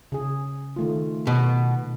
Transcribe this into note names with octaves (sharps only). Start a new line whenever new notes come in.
C#3 G#4
D#3 A3 F4
B2